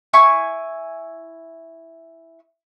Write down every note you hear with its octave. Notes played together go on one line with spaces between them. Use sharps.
E4 G#5 C#6